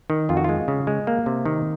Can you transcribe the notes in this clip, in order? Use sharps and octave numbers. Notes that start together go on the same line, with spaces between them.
D#3
F2 F4
F#4
G#3 F4
C#3
G#3
A#3
C3
D#3